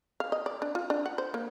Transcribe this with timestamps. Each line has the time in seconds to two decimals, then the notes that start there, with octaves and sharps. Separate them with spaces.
0.20 F5
0.32 D#5
0.46 D5
0.62 D4
0.75 F4
0.90 D4
1.06 F#5
1.18 C5
1.34 A#3